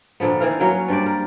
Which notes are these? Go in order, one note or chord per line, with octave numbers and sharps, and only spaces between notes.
A#2 D3 F3 B3
D#3 E3 F5
F#3 A#3 C#4
G2 G3 C5 D5
A#4